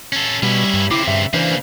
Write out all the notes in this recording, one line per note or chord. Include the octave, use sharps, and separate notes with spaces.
C#4 A4
B2 G3 C#4 E4
G2
C#3 C4 E4 D6
G2 E5
C#3 E3 A#3 D4 B4 C5